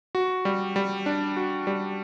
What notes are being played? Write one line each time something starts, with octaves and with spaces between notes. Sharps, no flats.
F#4
G3
G3
D4
F#4
G3